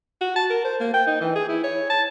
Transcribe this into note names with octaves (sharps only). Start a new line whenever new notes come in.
F#4
A5
A#4
C5
A#3
G5
D#4
E3
G#4
E4
C#5
A5